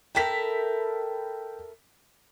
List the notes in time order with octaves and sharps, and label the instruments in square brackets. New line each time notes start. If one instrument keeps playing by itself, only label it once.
[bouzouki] E4 A4 A#4 [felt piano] G5 B6